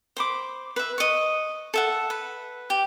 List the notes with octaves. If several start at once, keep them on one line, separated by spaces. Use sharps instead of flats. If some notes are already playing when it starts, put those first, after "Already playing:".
C5 B5 D6
B4 E5
D#5 C#6
A4 E5 F#5
B4
G4